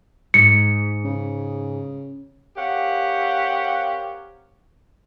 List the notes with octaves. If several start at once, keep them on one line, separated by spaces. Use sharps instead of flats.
G#2 C#7
C#3
C4 G4 A#4 C#5 F5 F#5